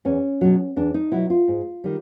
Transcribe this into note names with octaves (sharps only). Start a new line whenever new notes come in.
E2 C#4
B2 F#3
E2 D4
D#4
B2 F#3 E4
F4
G#2
D#3 G3